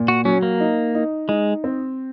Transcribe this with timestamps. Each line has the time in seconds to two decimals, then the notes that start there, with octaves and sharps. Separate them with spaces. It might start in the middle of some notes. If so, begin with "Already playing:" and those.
Already playing: A#2
0.08 F#4
0.25 F#3 C#4
0.43 A#3
0.60 D#4
0.95 D#4
1.29 G#3 D#4
1.64 C4